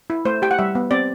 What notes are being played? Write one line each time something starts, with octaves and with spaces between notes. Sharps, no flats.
E4
A3 C5
G4 G5
F#5
G3 E5
B3
C4 D5